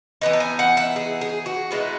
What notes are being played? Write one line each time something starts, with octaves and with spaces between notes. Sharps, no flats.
E3 B3 D#4
A5
G#5
F#5
E5
G#4
G#4
F#4
B2 G#3 B3 D#4 E4